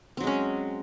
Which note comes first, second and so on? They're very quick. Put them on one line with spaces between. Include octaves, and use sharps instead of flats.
C4 F#3 G#3 C#4